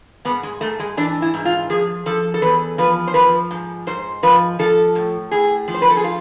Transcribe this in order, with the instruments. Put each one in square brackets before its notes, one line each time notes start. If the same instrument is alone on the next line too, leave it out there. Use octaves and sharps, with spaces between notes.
[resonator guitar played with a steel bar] G#2 B3
G#3
G#2 A3
G#3
E3 D4
E4
G#2
F4
F3 G#4
F3 A4
A4
E2 B4
F3 B4
C5
F3 B4
G#2
G#2 C5
F3 B4
F3 A4
A2
A2 G#4
F3
C5
B4
A4
G#4
F4